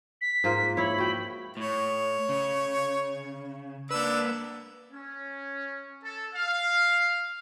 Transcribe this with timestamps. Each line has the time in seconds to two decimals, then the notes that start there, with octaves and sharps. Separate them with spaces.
0.21 B6
0.44 G#2 A#3 F4
0.77 E4 C#5 B5
0.98 F#4 G5
1.57 A2 C#5
2.29 C#3
3.91 A#3 D4 B4 E6
4.91 C#4
6.04 A4
6.33 F5